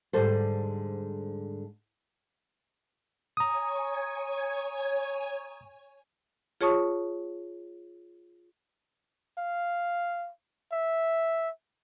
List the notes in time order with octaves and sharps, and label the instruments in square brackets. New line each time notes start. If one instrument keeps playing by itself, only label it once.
[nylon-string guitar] G#2 D3 G3 A4 C5
[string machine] C#5 G#5 [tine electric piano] A#5 D#6
[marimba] F4 G#4 C#5 A5 C#6 D#6
[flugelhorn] F5
E5